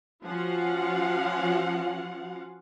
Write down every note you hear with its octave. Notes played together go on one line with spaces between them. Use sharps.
F3 C#4 F4 F#4 F5 F#5